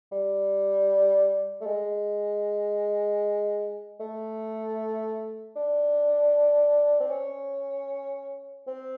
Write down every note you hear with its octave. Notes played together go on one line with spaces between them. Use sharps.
G3
A3
G#3
A3
D4
C4
C#4
C4